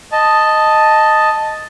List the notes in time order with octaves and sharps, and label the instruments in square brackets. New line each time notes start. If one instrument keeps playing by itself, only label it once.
[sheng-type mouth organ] D#5 A5